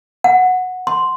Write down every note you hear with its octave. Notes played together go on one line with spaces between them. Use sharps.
F#5
C6